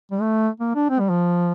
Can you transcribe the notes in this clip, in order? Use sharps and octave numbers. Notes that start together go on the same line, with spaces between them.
G3
A3
A#3
D4
C4
G3
F3